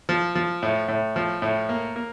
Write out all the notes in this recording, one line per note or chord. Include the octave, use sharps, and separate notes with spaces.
F3
F3
A2
A2
F3
A2
A#3
A#3